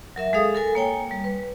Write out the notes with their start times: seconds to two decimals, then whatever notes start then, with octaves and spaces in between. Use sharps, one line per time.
0.16 F#3 A#4 E5
0.33 G#3 G#4 A4 F5 D#6
0.55 A4 A#4 G#5
0.75 A#3 C#5 G5 G#5
1.11 G3
1.24 B4